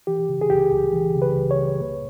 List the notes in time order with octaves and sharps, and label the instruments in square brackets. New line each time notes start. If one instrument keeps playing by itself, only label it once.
[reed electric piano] E3 G4
C#3
G#4
C#2 G4
C#2
E3
C#3
B4
C#2
C#5
C#2
A#3